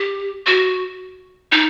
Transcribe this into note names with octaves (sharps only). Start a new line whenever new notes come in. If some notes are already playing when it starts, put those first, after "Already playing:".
Already playing: G4
F#4
D#4